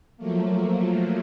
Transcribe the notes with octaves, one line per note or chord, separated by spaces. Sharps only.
F3 F#3 A3 A#3